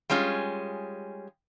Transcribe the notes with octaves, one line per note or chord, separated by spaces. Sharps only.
G3 G#3 C#4 F4